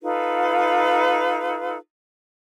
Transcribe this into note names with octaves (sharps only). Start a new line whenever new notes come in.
D#4 F4 A4 B4